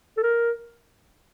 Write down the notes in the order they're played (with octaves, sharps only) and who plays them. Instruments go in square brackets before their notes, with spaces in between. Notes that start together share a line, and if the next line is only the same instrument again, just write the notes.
[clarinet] A4
A#4